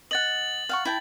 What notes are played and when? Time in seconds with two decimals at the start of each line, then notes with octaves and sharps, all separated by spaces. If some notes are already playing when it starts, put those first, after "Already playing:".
0.11 D#5 F#5 A6 F#7
0.69 F5 F#5 C#6
0.85 E4 G5 A5